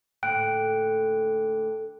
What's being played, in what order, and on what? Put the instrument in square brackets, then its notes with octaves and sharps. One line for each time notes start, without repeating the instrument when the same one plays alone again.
[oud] A2 D3 A#3 [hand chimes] G5 F#6 D7